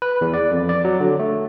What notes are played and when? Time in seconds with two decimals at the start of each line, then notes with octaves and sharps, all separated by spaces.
0.02 B4
0.21 E2
0.34 D5
0.51 F2
0.69 D5
0.85 F#3
1.00 D3
1.19 A3